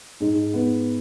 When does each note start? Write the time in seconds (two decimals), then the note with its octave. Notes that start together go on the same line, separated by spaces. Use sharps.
0.20 G#2
0.54 B3